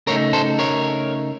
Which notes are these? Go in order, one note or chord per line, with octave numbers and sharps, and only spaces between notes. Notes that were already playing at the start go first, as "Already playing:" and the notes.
C#3 A3 D#4 A#4 C#5
A4 C5
A#4 C#5